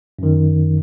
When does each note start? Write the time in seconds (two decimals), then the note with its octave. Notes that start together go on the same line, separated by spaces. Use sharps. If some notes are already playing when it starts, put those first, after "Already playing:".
0.19 F#2 D#3